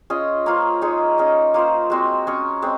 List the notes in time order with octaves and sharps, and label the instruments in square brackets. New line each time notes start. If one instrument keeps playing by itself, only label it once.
[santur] C#4 F4 G#4 D#5
A#3 C#4 F4 C5
G#3 D#4 G#4 C#5
C#4 G#4 D#5
A#3 F4 C5
G#3 C4 F#4 C5
C#4 G#4 C#5
G#3 C4